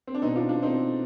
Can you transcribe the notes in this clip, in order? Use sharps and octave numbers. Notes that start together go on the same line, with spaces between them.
C4
D4
B2 B3 C4 D#4
D4 F4
D4 F4
C4 D#4